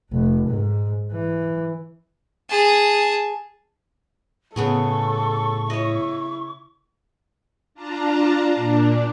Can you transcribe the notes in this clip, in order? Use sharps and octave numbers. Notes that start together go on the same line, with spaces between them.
F1
G#2
E3
G#4 A5
A2 C#3 B3 G#4 A4 C#6
E4 C#5 D#5
D4 F4 A5 A#5
A#2 D4